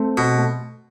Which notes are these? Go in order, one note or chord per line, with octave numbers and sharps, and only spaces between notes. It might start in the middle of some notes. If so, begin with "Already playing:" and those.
Already playing: A3 C4
B2
A3